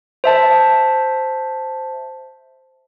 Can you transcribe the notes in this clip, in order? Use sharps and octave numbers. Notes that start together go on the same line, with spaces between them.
C5 E5 A5